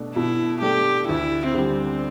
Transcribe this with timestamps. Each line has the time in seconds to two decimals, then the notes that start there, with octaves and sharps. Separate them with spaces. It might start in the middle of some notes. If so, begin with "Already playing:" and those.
Already playing: B2 A3 D4 A4
0.15 B2 E4
0.62 A3 D4 G4 A4
1.08 D2 E4
1.54 D3 G3 C4